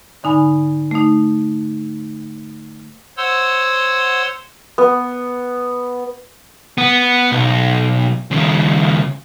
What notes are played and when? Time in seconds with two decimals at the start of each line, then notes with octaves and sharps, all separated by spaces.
0.23 G#2 D3 D#4 G#5 B5
0.91 A3 D#4
3.17 C5 C#5 F#5 C6 E6
4.78 B3
6.78 B3
7.32 B1
8.31 D#2 C#3